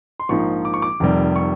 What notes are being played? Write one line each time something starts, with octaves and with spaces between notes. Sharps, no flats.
C6
A#1 G#2 F3 A#3 D#4 C#6
D6
C#6
D6
F1 F2 C3 D#3 G3
C#6